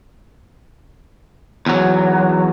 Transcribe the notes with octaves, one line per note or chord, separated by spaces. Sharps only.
E2 F#3